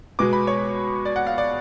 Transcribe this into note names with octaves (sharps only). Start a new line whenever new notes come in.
B2 G#3 B3 D6
B5
C#5
D5
F#5
F5
D5